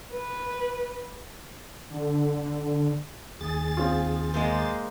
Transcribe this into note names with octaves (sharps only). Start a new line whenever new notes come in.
B4
D3
D#2 G#4 A6
C4 F4
G#3 A#3 C5